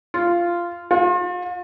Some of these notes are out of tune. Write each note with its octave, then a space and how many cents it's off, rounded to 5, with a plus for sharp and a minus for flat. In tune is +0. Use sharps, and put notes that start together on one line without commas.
F4 -10
F4 +40